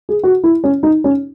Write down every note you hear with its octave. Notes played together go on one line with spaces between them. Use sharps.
G#4
F#4
E4
C#4
D#4
C#4